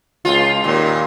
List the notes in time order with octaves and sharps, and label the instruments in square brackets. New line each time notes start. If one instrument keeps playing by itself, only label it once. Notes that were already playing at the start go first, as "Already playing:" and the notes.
[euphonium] C#2 [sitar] F4
[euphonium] D#2 [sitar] A#2